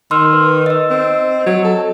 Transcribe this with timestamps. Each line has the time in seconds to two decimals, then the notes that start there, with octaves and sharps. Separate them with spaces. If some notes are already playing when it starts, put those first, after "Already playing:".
0.11 D#3 C6 E6 F6
0.33 B4
0.66 D#5 E6
0.90 C4
1.46 F#3
1.64 A4